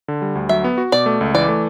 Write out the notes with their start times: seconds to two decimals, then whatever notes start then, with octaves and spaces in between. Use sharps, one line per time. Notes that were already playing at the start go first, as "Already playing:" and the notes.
0.08 D3
0.22 G3
0.35 D2
0.49 F#3 E5
0.64 B3
0.78 F#4
0.92 B2 D5
1.06 A3
1.21 C#2
1.34 E3 D5
1.48 A3